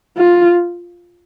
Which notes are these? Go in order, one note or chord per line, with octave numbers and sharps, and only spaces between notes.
F4